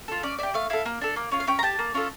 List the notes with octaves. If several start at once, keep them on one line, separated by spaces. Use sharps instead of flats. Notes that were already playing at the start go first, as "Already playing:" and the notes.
F4 A4
C#4 D5
E4 G4 D5
A3 F5
E4 A4 F5
A#3
D4 A4
A#3
C#4 F4
F5
C#4 G5
A#5
G4 A5
A#3
C#4 F4 A4